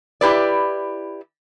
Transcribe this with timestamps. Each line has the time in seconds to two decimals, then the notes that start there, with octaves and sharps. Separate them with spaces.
0.21 E4 G4 B4 D5